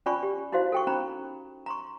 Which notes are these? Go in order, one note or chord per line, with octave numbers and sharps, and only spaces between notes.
C#4 F4 D5 G#5 B5 C#6
G4
D#4 E4 F#4 C5 F5
A4 G5 C#6
C#4 D#4 A#5 B5
A#5 C6 C#6